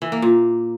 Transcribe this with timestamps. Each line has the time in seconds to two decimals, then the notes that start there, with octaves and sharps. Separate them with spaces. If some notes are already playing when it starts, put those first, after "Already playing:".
0.02 E3
0.12 A#3
0.22 A#2